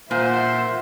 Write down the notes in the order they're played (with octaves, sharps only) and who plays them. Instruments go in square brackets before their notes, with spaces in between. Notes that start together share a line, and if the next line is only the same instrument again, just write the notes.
[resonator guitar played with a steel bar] A#2 [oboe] C5 [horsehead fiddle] E5 F#5